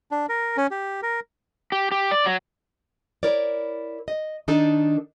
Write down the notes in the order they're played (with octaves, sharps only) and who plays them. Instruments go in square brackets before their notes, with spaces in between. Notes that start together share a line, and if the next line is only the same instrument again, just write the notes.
[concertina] D4
A#4
C#4
G4
A#4
[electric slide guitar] G4
G4
D5
F#3
[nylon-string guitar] E4 A#4 C#5 D5
D#5
D#3 D4 D#4 A4